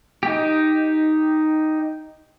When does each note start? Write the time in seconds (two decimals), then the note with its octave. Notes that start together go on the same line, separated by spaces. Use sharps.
0.23 D#4 G4